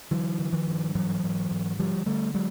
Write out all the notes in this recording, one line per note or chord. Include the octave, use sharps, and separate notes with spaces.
D3 E3 F#3
D3
D#3 F3
G2
G#2 E3 F#3
G#2
G#2
D3 F3 G3
D3 G3 A3
F#3 G#3